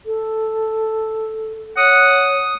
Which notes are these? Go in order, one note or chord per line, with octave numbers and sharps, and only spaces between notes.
A4
C#5 F#5 D#6